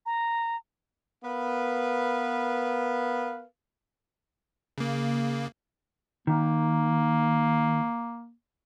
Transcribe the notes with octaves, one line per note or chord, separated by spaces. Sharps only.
A#5
B3 A#4 B4 F5
C#3 A#3
D#3 A#3